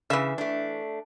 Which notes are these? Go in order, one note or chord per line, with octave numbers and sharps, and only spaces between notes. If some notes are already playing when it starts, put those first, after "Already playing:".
C#3 E3 E5
A3 D4